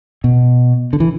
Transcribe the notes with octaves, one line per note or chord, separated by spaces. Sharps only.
B2
D3
E3